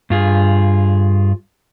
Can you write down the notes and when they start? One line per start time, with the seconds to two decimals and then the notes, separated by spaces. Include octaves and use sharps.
0.10 G2 F4 G#4